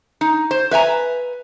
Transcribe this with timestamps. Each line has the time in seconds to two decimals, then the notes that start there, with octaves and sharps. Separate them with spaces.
0.21 D#4
0.51 C5
0.71 B4 E5 G#5 A#5